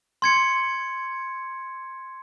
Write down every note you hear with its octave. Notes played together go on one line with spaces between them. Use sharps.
C6 G#6 C#7